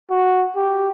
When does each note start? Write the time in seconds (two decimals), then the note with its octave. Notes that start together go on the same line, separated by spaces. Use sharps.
0.10 F#4
0.56 G4